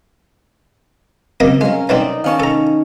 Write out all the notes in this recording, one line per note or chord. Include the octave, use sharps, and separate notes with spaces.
C#3 F#3 A#3 C4 D5 D#5
G#3 C#4 A#4 F5
E3 F#3 C4 D#4 D5 D#5
D#3 C#4 F5 A5 C#6
A4 A#5